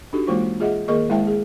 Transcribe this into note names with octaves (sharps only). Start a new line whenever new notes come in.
D4 D#4 F#4 G4 A4
E3 G#3 A#3 F4 C5 C#6
F4 G#4 D#5 E5 F#5
D#3 A#3 G#4 A#4 D#5 C#6
G#3 E4 C5 E5 G5 A5
G#4